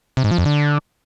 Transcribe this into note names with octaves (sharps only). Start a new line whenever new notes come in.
C3
G#2
F3
F2
D3